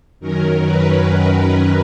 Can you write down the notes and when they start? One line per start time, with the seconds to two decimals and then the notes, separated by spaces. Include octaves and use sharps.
0.19 F#2 D#3 F#3 C#4 A#4
0.63 B4